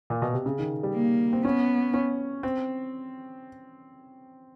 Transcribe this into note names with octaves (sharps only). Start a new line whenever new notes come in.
A#2
B2
C3
C#3
D#3
G3
A#3
C4
B3 C#4
C#4
C4